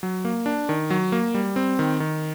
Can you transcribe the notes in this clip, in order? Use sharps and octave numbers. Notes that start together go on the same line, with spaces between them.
F#3
A#3
D4
D#3
F#3
A#3
G3
C4
D#3
D#3